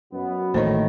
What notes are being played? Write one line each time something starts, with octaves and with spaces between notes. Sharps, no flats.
F#2 B2 B3
A1 D#2 A2 D#3 C5 C#5